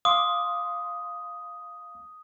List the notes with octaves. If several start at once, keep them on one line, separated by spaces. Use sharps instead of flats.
F5 C6 D6 D#6